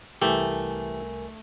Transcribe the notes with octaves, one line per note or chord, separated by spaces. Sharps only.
C2 E3 A3 G4 A#4 G#5